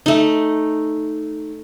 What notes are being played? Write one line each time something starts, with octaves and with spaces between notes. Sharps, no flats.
A3 D#4